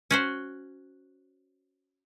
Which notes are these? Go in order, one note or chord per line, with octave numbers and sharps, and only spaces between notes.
C#4 F#4 C5